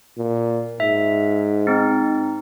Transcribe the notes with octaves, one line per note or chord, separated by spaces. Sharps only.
A#2
G#2 E5
C4 D#4